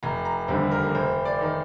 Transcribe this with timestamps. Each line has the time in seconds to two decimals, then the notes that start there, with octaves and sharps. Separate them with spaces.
0.03 F1 A#5
0.25 A#5
0.48 D#2 D3 G3 C5
0.71 A#4
0.95 F1 C5
1.25 D5
1.41 D#3